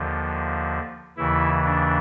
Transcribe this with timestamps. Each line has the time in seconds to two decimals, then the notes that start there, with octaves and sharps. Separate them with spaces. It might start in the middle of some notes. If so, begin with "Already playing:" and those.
Already playing: D#2 D3 F3
1.17 D#2 C#3 E3 E4
1.65 D4